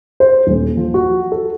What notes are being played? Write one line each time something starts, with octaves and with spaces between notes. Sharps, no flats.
C5
D#1
F3
F#4
A4